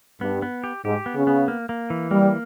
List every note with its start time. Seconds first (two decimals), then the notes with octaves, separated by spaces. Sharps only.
0.21 G2 B3
0.42 B3
0.64 G4
0.85 G#2 G4
1.06 B3
1.16 C#3
1.27 B3
1.48 A#3
1.69 A#3
1.90 E3
2.11 G3 A#3